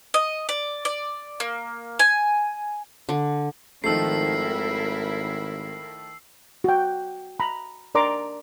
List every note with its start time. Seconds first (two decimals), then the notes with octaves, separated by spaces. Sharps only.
0.14 D#5
0.49 D5
0.85 D5
1.40 A#3
1.99 G#5
3.09 D3
3.84 G#1 D#3 F3 A3 E4 A#4 E6 C7
6.64 F#4 G5
7.40 A#5 B5
7.95 D4 A#4 D5 A#5 C6 D6